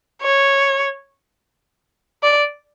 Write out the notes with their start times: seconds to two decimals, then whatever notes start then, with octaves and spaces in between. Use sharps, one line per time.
0.22 C#5
2.23 D5